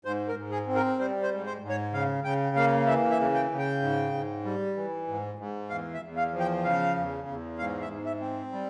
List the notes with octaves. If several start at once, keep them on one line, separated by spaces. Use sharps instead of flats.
G#2 C5
A#4
G#2
G#4
C4
A#4
G3 C5
C5
G#2
C5
G#2
C#5
C#3 F5
C#3 G5
A#3 F5
E3 E5
E5
C#3
G5
C#3
G5
G#2
G#2
G3
E3
G#2
G#2
E2 F5
E5
E2
F5
F3
G5
C#3 F5
E2
E2
G#2 F5
E5
G#2
E5
C4
G3